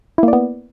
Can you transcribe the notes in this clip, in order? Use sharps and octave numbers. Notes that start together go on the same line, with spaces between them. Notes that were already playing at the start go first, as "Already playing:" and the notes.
A#3 B3 E4 D5